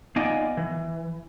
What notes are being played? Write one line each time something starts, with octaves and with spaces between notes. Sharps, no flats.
B3 D#4 F4 D5 D#5 G#5
E3